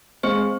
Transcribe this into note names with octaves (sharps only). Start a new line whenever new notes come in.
G#3 C4 C5